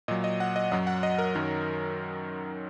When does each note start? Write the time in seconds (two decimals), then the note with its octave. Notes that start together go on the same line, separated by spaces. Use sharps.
0.08 A#2 F#3 D#5
0.24 D#5
0.40 F#5
0.56 D#5
0.72 F#2 F#3 D#5
0.87 F#5
1.03 D#5
1.18 A#4
1.35 F#2 D#3 F#3